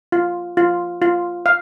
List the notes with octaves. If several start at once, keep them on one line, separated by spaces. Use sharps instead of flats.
F4
F4
F4
F5